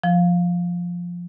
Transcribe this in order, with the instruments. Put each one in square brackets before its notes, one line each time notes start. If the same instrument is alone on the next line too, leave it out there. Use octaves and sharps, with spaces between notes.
[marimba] F3